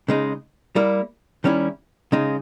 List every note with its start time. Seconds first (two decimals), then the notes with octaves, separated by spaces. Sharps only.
0.08 C#3 G#3 D#4
0.76 G3 A#3 E4
1.44 D#3 G3 C#4 E4
2.12 C#3 G#3 D#4